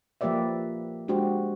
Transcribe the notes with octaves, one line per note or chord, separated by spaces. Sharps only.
F3 A#3 G4 B4 D5 E5
G#3 D4 F#4 G4 C5